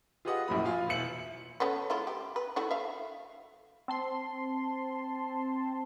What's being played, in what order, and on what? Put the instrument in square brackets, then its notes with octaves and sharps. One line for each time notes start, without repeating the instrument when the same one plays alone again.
[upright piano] F4 G4 G#4 B4 D#5 F#5
A#1 F#2 A2 F#3 B5
F4 F5 G#5
E1 B2 E4 C#7 F#7
[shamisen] A3 B3 C#4
G#3 E4 F4
G4
B4
A3 E4 F#4
E5 F5
[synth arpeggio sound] C4 A5 C6